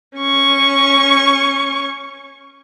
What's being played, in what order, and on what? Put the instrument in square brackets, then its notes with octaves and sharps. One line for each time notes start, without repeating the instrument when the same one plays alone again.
[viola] C#4 C#6